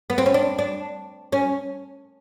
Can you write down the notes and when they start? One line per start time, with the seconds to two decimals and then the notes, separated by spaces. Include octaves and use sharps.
0.10 B3
0.18 C4
0.26 C#4
0.34 D4
0.59 D4
1.32 C#4